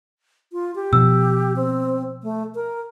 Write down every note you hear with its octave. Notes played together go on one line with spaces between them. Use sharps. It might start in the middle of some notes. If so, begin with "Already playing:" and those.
F4
G4
B2 F3 E6
C4
A3
A#4